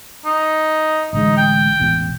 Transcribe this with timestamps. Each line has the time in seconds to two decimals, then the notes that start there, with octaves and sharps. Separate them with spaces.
0.25 D#4
1.13 A1 D3 G#3 D#4
1.37 G5
1.79 E1 A1 B2